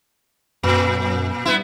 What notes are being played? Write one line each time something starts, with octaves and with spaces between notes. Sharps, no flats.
F#2 A#2
G2 B3 E4